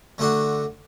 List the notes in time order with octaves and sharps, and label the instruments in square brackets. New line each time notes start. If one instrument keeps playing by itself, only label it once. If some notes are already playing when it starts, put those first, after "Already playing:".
[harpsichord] D3 A3 D4 F#4